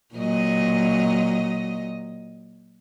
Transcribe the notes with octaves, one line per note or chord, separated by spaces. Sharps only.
A#2 F#3 D#5